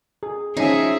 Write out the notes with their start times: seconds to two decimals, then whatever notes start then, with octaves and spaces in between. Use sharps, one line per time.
0.23 G#4
0.57 F3 C#4 D#4 G#4 E5 G#5